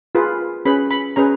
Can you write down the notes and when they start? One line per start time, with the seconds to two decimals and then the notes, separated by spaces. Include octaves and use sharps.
0.15 F4 G#4 B4
0.65 C#4 G#4 B4 B5
0.91 B5
1.16 C#4 G#4 B4 A#5